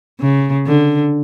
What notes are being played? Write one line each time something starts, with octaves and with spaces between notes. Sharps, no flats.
C#3
D3